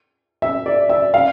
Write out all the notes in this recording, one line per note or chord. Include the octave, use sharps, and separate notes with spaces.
E5
D5
E5
F5